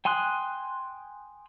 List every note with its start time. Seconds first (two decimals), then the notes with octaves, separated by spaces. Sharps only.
0.05 G5 G#5 C6 D#6 F#6